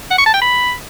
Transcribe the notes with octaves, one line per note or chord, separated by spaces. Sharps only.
F#5
C#6
A5
G5
B5